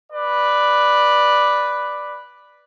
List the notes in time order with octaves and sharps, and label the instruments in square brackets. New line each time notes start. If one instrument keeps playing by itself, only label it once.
[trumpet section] B4 D5